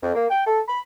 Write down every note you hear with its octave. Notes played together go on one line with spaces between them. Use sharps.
F2
A#3
G5
A4
B5